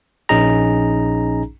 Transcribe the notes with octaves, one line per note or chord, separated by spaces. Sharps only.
A#1 C#4 D#4 G#4 A#5